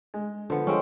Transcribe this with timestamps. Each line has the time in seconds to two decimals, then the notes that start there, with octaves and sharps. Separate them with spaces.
0.14 G#3
0.50 D3 F3 B3 A4
0.67 F3 G#3 C4 C#4